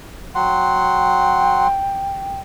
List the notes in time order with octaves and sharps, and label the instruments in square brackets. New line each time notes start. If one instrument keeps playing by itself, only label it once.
[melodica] F#3 F#5 C6 [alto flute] G5